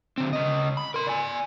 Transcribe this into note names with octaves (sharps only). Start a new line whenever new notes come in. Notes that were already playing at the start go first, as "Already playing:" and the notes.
D3 C4
C#3 D#5
B5
A#4 C6
D5 G#5